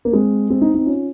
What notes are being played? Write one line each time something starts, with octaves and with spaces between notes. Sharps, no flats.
A#3
G#3 C4
G#3 C4
C4 D#4
C4 D#4
C#4 F4